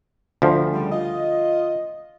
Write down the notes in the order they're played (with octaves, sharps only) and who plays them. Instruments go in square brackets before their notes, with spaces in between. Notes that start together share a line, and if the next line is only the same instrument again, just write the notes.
[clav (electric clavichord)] D2 F3
[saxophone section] C#3 G3
F4 D#5